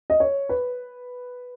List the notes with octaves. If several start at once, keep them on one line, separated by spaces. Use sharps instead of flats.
D#5
C#5
B4